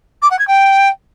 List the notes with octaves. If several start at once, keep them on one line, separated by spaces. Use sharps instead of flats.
D6
F#5
G#6
G5